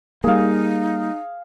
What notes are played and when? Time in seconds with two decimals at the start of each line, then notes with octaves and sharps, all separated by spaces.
0.24 G3 A#3 D#4 G#4 F5